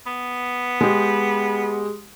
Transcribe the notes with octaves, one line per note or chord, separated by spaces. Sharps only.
B3
G#3 G4